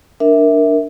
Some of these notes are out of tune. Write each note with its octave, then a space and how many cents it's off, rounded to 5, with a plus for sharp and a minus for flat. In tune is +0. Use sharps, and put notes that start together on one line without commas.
D4 +0 A#4 +0 E5 -15